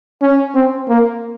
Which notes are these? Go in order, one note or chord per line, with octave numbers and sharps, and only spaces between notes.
C#4
C4
A#3